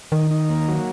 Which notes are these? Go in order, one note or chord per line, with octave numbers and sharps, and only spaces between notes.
D#3 D#4
D#4
A#3
F#3